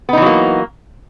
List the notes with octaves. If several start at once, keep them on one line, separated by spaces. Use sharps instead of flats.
E3 F#3 A#3 B3 D#4